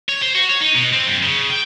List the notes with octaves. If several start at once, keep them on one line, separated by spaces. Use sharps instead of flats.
C#5
C5
F#4
C#5
D#4
B2
C4
F#2
C#3
G5